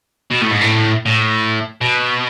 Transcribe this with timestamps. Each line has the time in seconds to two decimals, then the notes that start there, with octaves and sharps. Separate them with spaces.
0.31 B2
0.42 A2
0.51 G#2
0.62 A2
1.06 A2
1.81 B2